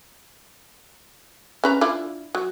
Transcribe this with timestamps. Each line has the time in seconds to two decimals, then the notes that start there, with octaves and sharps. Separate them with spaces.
1.64 C#4 B4 A#5
1.81 D4 E4 F4
2.35 F#3